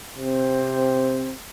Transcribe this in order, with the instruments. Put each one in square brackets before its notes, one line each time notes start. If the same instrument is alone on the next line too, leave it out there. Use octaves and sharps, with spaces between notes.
[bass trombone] C3 [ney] C4